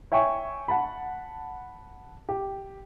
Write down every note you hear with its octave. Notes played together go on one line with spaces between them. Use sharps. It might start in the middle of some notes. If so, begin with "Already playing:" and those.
C#5 E5 G5 G#5 C#6
F#5 A5 B5
G4